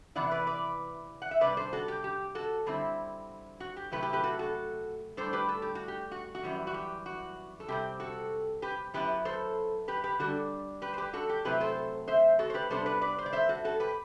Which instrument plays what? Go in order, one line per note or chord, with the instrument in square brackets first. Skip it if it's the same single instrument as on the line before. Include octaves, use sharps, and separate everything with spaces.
[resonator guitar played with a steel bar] C3 E3 B3 E4 D5 F#5
B4 D5
B4 D5
F#5
E5
C3 G3 D4 B4 D5
A4 C5
F#4 A4
G4
G4
F#4 A4
D3 G3 C4 E4
F#4
G4
C3 F#3 A3 E4 G4 B4
G4 B4
G4 B4
F#4 A4
F#4 A4
A2 G3 D4 A4 C5
G4 B4
A4
G4
F#4
G4
F#4
F#4
F#2 E3 G3
F#4
G4
F#4
A4
C3 G3 C4 G4
F#4 A4
G4 B4
F#2 F#3 B3 E4 G4 B4
A4 C5
G4 B4
G4 B4
D3 G3 D4 F#4 A4
G4 B4
C5
G4 B4
F#4 A4
G4
C3 F#3 A3 C4 E4 G4 B4
A4 C5
C5 E5
F#4 A4
C5
G4 B4
C3 G3 B3 D4 A4 C5
B4 D5
B4 D5
C5
D5
C5 E5
F#4 A4
F#4 A4
G4 B4